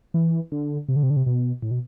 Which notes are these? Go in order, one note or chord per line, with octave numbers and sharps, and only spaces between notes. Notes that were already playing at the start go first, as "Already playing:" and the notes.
E3
D3
C3
D3
C3
D3
C3
B2
A2
B2